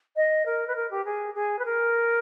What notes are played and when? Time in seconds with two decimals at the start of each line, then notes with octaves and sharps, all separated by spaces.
0.16 D#5
0.45 A#4
0.67 B4
0.75 A#4
0.90 G4
1.05 G#4
1.34 G#4
1.58 B4
1.65 A#4